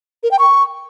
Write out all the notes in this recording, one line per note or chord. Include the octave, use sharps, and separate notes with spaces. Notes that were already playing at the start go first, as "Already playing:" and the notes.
A#4
G5
C#6